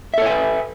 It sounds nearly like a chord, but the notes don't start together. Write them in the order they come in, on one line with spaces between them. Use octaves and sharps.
E5 A4 C#5 G#5 B4